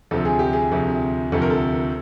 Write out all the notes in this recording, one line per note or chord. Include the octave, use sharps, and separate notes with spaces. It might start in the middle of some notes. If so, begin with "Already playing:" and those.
D2 C3 F3 A4
G#4
G4
G#4
D2 C3 F3
D2 C3 F3 A4
A#4
A4